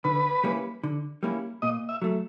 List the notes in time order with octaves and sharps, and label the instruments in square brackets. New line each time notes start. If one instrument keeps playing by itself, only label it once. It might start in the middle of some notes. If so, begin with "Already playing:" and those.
[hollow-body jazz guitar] D3 [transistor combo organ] B4
[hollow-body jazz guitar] G3 A#3 C#4 E4
D3
G3 A#3 C#4 E4
[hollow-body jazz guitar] A#2 [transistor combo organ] D#5
[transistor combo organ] E5
[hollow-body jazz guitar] F#3 A3